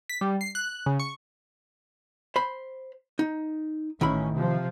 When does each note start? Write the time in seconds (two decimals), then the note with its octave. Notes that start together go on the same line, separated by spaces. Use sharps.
0.09 B6
0.21 G3
0.41 C7
0.55 F#6
0.86 C#3
1.00 C#6
2.36 C5 B5
3.19 D#4
4.01 A1 D#3 C#4 E4 B5
4.34 C3 F3